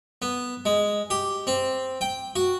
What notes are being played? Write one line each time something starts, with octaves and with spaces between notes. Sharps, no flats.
B3
G#3
G4
C4
G5
F#4